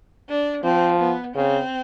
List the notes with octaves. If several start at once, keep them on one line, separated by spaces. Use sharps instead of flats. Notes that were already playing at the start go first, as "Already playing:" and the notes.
D4
F3 C4
B3
C#3 C4